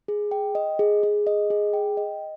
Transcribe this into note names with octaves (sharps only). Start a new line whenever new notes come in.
G#4
G5
D#5
G#4
G#4
D#5
G#4
G5
D#5